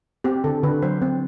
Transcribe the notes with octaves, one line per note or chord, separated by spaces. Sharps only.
C4 G4
D3 A4
D3 B4
F#3 C5
C4